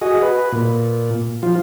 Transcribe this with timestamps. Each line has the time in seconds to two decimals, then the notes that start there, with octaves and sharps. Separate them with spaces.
0.02 F#4 G#4 D#5
0.22 B4
0.52 A#2
1.43 F3 F4